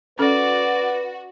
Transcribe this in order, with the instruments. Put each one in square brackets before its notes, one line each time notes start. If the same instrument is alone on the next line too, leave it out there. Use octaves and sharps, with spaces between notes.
[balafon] C#4 A4 [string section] F#4 [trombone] B4 [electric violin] D5